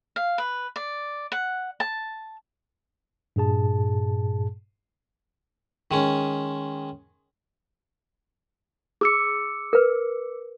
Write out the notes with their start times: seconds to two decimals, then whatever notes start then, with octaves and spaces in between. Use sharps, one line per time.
0.16 F5
0.38 B4
0.76 D5
1.32 F#5
1.80 A5
3.36 G2 A#2 G#4 A5
5.91 D#3 G#3 C#4
9.01 G#4 D6 E6 C#7
9.73 A#4 B4